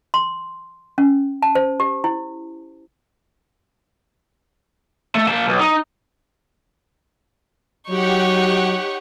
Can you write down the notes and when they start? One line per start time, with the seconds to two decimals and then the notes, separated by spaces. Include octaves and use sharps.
0.14 C6
0.98 C#4
1.43 A5
1.55 C5
1.80 G4
2.04 E4
5.15 A3
5.28 A#3 A5
5.47 B1
5.60 D#4
7.90 F#3 D#4 G4 C#5 F#5 C#6